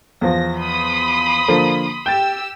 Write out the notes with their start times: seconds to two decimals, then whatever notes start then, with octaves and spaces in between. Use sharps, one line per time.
0.21 E2 F3 A#6
0.57 B5 C6 D#6
1.48 D3 F3 A#3
2.06 G4 G5 E6 A6